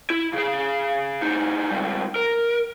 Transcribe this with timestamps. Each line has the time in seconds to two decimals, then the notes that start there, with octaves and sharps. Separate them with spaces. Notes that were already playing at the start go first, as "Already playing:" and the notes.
0.10 E4
0.33 C#3 G#4
1.21 A2 D#4
1.71 C#2 G3
2.16 A#4